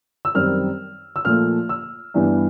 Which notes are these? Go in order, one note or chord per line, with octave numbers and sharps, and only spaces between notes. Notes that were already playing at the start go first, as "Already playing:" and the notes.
E6
F#2 D#3 G3 C4 F6
E6
A#2 F3 A3 F6
E6
G2 E3 G3 B3